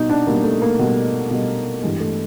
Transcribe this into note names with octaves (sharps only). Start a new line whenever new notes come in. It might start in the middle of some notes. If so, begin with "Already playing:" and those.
Already playing: B2 G3 D#4
D4
B2 G3 A#3
A3
A#3
B2 G3
B2 G3
G2 E3 G3 G#3
A3